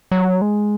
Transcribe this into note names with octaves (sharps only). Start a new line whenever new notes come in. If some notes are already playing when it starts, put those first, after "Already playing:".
F#3
G#3